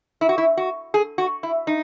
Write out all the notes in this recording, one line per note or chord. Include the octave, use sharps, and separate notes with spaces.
E4
F#4
E4
F#4
G#4
F#4
E4
D#4